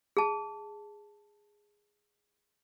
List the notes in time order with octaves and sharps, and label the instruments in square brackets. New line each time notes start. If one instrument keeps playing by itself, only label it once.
[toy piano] G#4 A5